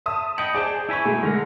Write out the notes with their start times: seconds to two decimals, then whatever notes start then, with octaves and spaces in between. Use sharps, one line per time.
0.06 E5 A5 D#6
0.38 D#5 G5 B5 C#7
0.54 G#4 C5 D5 A5 G6
0.89 E4 G#5 B5 C#6 E6
1.05 B2 G#3 A3
1.23 D3 G#3 A#4